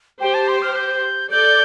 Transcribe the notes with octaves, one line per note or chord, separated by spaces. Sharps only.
G4 C5 G5
A5
C6
F6
G6
A4 D5 G6